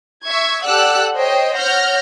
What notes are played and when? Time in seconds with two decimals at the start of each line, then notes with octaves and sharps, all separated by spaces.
0.24 E5 C#6 G#6
0.64 G4 A4 D5 F#5 E6 F#6
1.15 C5 C#5 D#5 G5
1.55 C#5 F#5 F6 G6 A#6